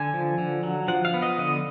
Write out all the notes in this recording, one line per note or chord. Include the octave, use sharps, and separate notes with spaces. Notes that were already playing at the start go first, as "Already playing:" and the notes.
Already playing: D3 G#5
F3
D3
F#3
F3 F#5
F5
B3
D#5
D3 D#5